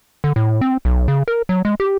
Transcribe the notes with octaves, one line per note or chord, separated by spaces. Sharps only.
D3
A2
C4
B1
C#3
A#4
F#3
G#3
G4